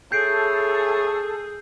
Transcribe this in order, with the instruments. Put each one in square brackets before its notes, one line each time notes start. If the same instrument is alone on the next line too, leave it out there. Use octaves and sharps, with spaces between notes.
[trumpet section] E4 C#5 [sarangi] G#4 [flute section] A4 [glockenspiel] G6 C7 D7